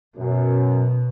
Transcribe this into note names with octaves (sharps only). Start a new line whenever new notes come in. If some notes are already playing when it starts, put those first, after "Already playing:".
F#2 B2